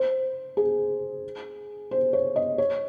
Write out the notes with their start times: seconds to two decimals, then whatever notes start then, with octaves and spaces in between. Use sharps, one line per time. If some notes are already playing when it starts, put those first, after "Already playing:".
Already playing: C5
0.57 G#4
1.91 C5
2.13 C#5
2.36 D#5
2.58 C#5